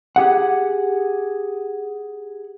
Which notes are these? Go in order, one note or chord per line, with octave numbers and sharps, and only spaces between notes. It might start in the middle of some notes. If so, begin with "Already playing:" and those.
G4 G#4 F#5